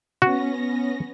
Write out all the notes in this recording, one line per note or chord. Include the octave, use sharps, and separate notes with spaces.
B3 C#4 F#4 A#6